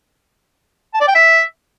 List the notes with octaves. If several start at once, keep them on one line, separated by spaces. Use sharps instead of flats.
A5
D5
G5
E5